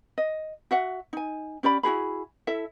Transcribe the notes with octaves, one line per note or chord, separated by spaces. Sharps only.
D#5
F#4 E5 F#5
D#4 G#5
C#4 G4 D5 B5
E4 F#4 G#4 B5
E4 A4 E5